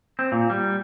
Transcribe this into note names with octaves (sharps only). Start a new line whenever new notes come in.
C4
A#2
G3